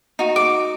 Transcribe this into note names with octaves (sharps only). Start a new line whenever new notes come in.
D#4 F#4
D6